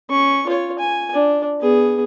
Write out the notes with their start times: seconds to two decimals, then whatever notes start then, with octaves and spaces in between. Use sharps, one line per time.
0.10 C#4 C#6
0.47 F4 C#5
0.79 G#5
1.14 D4
1.61 B3 G#4